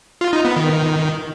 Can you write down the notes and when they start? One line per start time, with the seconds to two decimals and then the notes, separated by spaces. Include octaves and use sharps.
0.21 F4
0.33 D#4
0.45 B3
0.56 D#3